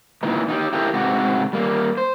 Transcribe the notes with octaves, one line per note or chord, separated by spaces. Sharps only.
A#2 E3 D#4
D#4 F4 G4
E4 G4 A4 A#4 D#5
G#2 C3 F#4 G4
G3 A#3
C5